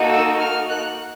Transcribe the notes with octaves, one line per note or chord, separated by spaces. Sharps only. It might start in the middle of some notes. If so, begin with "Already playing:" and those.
Already playing: A#3 D#4 F#4 A4
E6
F6
F#6